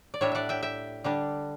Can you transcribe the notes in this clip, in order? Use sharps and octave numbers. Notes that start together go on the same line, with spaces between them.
D5
A2 G3 D4 C#5 E5
D5 E5 F#5
E5 G5
E5 G5
D3 G3 D4